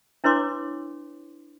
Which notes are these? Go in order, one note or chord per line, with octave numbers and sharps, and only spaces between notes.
D4 E4 B4 C#5 C6 D6